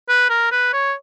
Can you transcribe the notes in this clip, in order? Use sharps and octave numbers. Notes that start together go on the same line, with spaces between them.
B4
A#4
B4
C#5